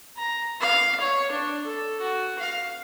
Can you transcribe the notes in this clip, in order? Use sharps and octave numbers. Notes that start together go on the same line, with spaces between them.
A#5
F5
C#5
D4
A4
F#4
F5